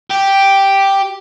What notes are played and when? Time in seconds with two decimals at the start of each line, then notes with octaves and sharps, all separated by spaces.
0.11 G4